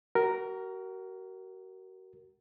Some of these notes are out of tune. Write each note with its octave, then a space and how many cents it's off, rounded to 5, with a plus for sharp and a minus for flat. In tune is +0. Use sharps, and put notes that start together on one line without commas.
F#4 +35 A#4 +0